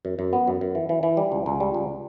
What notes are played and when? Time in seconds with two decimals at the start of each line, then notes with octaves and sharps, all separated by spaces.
0.05 F#2
0.19 F#2
0.33 B3
0.48 F#2
0.61 F#2
0.75 E3
0.89 E3
1.03 E3
1.17 G3
1.32 C#2
1.46 C#2
1.60 G3
1.75 C#2